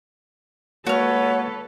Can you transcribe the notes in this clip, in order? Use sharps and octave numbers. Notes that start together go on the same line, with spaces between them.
G#3 A#3 F#4 A4 B4 C#5 F6